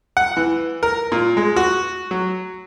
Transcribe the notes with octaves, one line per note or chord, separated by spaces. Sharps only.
F#5
E3
A#4
A#2
G#3
F#4
F#3